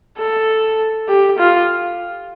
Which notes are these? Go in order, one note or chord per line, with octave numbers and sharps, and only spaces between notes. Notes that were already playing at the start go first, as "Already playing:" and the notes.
A4
G4
F4